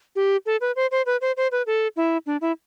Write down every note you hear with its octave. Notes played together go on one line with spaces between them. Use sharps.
G4
A4
B4
C5
C5
B4
C5
C5
B4
A4
E4
D4
E4